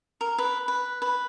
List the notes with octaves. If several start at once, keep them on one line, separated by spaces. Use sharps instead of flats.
A#4
B4
B4
B4